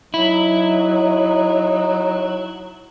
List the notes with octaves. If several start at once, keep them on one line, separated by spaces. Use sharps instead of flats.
F#3 D#4 E4